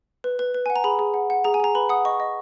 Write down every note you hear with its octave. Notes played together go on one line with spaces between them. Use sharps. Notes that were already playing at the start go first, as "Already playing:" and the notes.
B4
B4
B4
F#5 G#5
A#5
G#4 B5
G#4
F#5
F#5
G#4 A#5
G#5
G#4 A#5
B4 B5
F#5 D#6
D#5 C#6
D#5